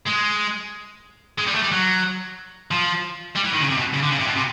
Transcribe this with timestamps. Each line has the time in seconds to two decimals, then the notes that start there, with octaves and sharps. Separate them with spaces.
0.06 G#3
1.38 G#3
1.47 G3
1.55 A3
1.63 G3
1.72 F#3
2.71 F3
3.36 G3
3.45 E3
3.53 D#3
3.61 C#3
3.70 C3
3.78 B2
3.94 C#3
4.03 D3
4.11 C#3
4.20 C3
4.27 B2
4.36 C3